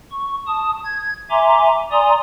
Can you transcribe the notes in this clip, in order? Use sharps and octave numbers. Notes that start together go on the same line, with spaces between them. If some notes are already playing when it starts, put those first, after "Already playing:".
C#6
A5 D#6
G#6
E5 G#5 A#5 C6 D6
D5 G#5 A#5 C6 D#6